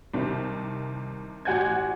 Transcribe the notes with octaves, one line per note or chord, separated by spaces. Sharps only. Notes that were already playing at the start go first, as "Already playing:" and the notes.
C2 C3 D#3
A1 F#4 F#5 G#5 G6 G#6